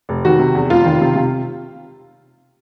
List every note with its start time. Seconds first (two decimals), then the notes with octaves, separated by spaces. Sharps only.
0.09 F1
0.25 D#3 F#4
0.39 C3
0.55 E2
0.70 F1 F4
0.85 D#3
1.01 C3
1.16 C3